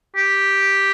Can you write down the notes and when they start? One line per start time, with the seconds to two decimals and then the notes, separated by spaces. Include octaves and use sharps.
0.16 G4